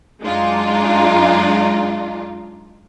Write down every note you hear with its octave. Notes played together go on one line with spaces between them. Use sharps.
F#2 G#3 D4 D#4 F4